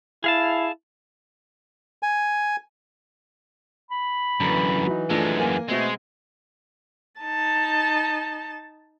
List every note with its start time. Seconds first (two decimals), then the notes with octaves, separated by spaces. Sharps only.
0.24 E4 G#4 F5 A5
2.03 G#5
3.91 B5
4.40 F#2 D3 E3 A#5
4.87 F#3 D#4
5.10 F#2 F3 G#3 A3 D4
5.40 A#3 G#5
5.69 B2 G#3 A3 C4
7.21 D#4 A5